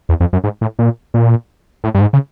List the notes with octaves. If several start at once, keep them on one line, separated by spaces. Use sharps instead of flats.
E2
F2
F#2
G#2
A2
A#2
A#2
A2
G2
G#2
C#3